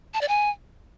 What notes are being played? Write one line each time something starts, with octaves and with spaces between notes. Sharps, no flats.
A5
D5
G#5